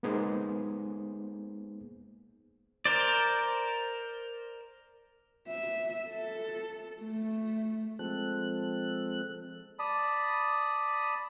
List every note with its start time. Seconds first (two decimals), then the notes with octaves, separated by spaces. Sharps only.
0.03 G#3 A#3 B3 D#4 G#4 C5
2.86 A#4 C5 D5
5.48 E5
6.10 A4
7.01 A3
7.99 F3 G#3 C4 A4 F#6
9.79 D5 A5 B5 D#6